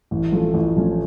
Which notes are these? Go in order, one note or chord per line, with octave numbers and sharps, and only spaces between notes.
A1
A2 F3 A3 C#4
A1
A2 F3 A3 C#4